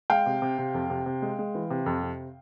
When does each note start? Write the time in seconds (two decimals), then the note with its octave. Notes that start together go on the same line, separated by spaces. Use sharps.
0.10 G#3 F5 G5
0.26 C3
0.42 C3
0.58 C3
0.74 F2
0.90 C3
1.06 C3
1.22 G#3
1.39 G#3
1.55 E3
1.70 C3
1.86 F2
2.03 C3